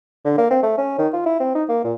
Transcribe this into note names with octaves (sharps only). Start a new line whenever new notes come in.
D3
A#3
C4
A3
C#4
D#3
F4
E4
C4
D#4
A#3
A#2